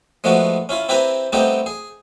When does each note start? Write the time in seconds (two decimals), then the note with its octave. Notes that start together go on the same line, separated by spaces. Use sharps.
0.24 F3 G#3 A3 B3 D4 F#4
0.69 C#4 E4 F4
0.89 C4 E4 G4 B4 G#5 A#5
1.32 G3 A3 B3 C4 D#4 G4
1.66 G#4